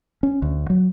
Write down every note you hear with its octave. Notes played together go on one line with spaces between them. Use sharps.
C#4
D2
F#3